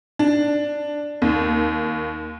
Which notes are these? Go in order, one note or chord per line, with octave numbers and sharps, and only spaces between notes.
D4
D#2